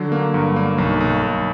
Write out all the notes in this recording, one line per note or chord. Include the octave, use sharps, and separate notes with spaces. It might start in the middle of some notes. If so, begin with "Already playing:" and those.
Already playing: D3 F#3
A#3
G2
A#3
B1
B1
B1